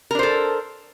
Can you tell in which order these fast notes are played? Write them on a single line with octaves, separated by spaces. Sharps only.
A#4 D4 C5 A4